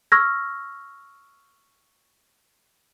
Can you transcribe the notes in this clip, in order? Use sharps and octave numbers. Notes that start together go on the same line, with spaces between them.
C#6 E6 F6 G#6 A#6